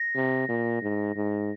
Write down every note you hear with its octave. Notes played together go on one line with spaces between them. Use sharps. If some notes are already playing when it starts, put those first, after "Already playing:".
Already playing: A#6
C3
A#2
G#2
G#2